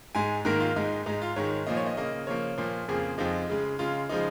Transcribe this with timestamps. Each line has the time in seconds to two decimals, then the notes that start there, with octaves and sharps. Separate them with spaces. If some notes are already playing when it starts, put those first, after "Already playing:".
0.15 G#2 G#3 G#5
0.45 G#2 D#3 A#3 A#4
0.60 F4
0.76 G#2 G#3 D#4
1.06 G#2 G#3 D#4
1.22 F4
1.36 G#2 D#3 G#3 C#5
1.67 A#2 F3 A#3 D#5
1.77 C#5
1.86 D#5
1.97 C#3 A#3 D#5
2.27 C#3 F3 A#3 C#5
2.58 A#2 F3 A#3
2.88 F2 C#3 F3 A#3 G#4
3.18 F2 F3 G#3 D#4
3.49 C#3 G#3
3.79 C#3 G#3 F4
4.09 C#3 F3 G#3 D#4